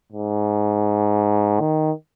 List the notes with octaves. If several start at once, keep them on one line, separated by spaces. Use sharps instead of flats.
G#2
D#3